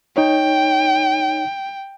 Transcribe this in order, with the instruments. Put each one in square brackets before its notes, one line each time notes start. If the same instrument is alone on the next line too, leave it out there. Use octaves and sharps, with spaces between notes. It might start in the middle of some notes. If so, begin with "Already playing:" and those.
[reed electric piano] D#4 C#5 [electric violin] G5